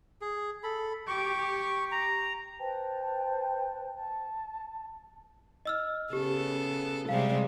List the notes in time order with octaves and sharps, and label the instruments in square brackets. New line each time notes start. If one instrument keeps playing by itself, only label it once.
[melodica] G#4
A4 B5
[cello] G4 [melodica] C#6
[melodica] A#5
[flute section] B4 C5 G5 A5
A5
[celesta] D#5 E6 F6
[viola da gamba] C#3 B3 A4 [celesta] G4
[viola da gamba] C3 G3 G#3 [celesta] F5